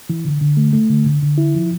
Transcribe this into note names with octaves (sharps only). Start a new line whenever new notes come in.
E3
D3
D3
A3
A3
D3
D3
D3
E4
F3